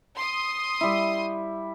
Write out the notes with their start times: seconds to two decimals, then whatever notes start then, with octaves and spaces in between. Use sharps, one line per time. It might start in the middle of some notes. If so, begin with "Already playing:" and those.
0.15 C6 D#6
0.81 G3 E4